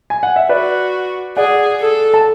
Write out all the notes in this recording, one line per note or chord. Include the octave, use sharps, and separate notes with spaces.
G#5
F#5
E5
F#4 B4 D5
G#4 D5 F#5
A4
A5